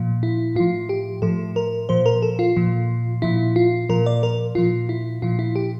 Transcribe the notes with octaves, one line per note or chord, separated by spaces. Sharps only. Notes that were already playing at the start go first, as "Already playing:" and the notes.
Already playing: A#2 F3
E4
A2 F3 F4
G4
A2 F3 A4
A#4
A#2 F3 C5
A#4
A4
F4
A#2 F3
A#2 F3 E4
F4
A#2 F3 A#4
D5
A#4
A#2 F3 F4
E4
A#2 F3 F4
E4
G4